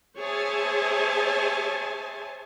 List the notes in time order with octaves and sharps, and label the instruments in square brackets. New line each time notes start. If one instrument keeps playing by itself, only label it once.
[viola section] G#4 C5 C#5 E5 G#5 A5